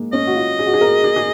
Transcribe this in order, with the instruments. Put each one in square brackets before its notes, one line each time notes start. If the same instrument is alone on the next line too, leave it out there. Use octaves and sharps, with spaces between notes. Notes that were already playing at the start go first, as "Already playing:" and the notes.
Already playing: [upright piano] G#3 A#3
[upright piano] C#4 [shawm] D#5
[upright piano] F#4
F4
G#4
F#4
G#4
A#4
G#4
G#4